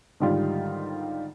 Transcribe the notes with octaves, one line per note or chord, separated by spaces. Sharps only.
G#2 D3 D#3 G3 F4